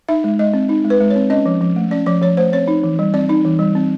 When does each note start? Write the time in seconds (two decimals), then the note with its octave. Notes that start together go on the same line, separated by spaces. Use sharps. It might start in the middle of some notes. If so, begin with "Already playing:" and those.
0.09 D#4 E5
0.24 G#3
0.39 G#3 D#5
0.54 C4
0.69 D#4
0.85 G#3
0.90 B4
1.00 G#3
1.10 C#5
1.16 C4
1.30 C#4 D#5
1.46 F3
1.61 F3
1.76 A3
1.91 C#4 D5
2.06 F3 D5
2.22 F3 C#5
2.37 A3 C5
2.52 C4 C#5
2.68 D#4
2.84 E3
2.99 G3
3.14 C4 D5
3.29 D#4
3.45 E3
3.59 G3
3.75 C4